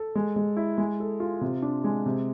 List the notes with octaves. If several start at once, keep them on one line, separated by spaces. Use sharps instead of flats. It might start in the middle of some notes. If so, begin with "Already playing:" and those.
Already playing: A4
G#3
G#3
E4
G#3
A4
F4
C3
D4
G#3
C3